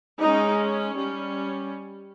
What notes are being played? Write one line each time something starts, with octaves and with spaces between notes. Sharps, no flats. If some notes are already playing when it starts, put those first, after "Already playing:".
G#3 C#4 D#4
G3 C#4